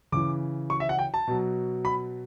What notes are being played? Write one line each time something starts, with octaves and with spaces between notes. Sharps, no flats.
C#3 E3 D6
C#6
E5
F#5
G5
A5
B2 F#3
B5